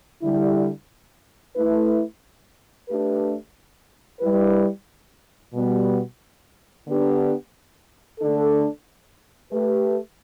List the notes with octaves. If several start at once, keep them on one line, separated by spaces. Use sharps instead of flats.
D3 G3 E4
A3 E4 B4
A3 D4 G4 B4
G3 E4 B4
B2 G3 B3
D3 B3 D4 G4 B4
D3 A3 D4 A4
A3 G4 B4